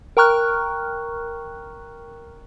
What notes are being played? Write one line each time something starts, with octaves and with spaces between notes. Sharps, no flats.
A#4 G5 A#5 C#6 F6 F#6